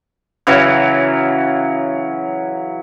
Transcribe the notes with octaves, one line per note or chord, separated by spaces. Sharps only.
C#3 E3 F#3